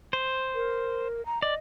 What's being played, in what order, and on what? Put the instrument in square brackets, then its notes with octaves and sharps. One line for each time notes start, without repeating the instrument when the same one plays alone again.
[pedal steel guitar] C5
[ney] A#4
A#5
[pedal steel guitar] D5 [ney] D#5